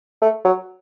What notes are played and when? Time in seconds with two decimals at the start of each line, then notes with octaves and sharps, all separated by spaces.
0.22 A3
0.45 F#3